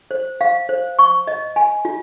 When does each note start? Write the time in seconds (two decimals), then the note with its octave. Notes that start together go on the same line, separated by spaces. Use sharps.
0.11 C5
0.41 F5
0.69 C5
0.99 C#6
1.27 D#5
1.56 G#5
1.85 F4